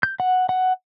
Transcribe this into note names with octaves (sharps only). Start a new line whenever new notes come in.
G6
F#5
F#5